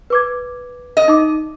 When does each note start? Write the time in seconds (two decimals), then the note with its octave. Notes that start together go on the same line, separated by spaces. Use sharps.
0.10 B4 D6 G#6
0.97 D#5
1.08 D#4 D6